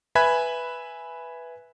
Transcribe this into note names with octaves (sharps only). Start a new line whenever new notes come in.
B4 E5 G#5 B5 F#6 G#6